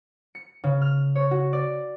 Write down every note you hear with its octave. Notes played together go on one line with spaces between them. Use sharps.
C#7
C#3
F6
C#5
F#4
D5